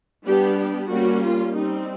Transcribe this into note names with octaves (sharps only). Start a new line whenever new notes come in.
G3 B3 D4 G4
G4
G3 A#3 C#4 F#4
F4
G3 C4 D#4